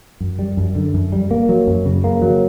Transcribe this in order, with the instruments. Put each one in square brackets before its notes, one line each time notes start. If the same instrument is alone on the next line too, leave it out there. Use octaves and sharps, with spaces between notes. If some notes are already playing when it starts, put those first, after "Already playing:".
[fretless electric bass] F#2
G3
F#2
D3
F#2
G3
A#3
F#3
F#2
C#3
A#3
F#3